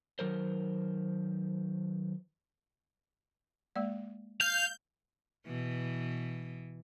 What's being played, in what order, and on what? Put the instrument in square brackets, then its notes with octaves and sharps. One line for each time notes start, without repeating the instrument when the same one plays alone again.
[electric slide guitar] D#3 F#3 A#4 C5
[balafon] G#3 A#3 D5
[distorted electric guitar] F5 [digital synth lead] G6
[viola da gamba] B2 E3